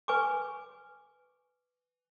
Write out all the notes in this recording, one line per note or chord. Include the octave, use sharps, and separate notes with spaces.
B4 G#5 C#6 D6